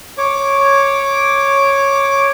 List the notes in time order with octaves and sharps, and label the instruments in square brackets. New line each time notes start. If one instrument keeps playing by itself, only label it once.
[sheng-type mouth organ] C#5 D6